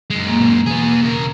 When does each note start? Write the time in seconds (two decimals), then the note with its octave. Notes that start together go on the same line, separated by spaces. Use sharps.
0.10 F#2 G#3
0.27 A#3
0.40 G#1 A2 B3
0.66 E2 B2 E3 B3 G#4
1.01 C#3 A#4